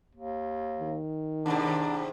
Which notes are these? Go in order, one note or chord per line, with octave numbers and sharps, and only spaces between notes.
D#2
D#3
D#2 G#2 C3 D4